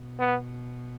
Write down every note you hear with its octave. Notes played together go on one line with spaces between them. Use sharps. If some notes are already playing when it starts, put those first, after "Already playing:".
Already playing: B2
B3